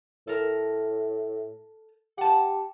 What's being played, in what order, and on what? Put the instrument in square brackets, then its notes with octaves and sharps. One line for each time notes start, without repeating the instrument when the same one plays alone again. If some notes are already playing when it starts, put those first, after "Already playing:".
[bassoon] A2 [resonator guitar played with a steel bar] A4 A#4
[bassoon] G4 [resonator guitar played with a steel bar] F#5 A5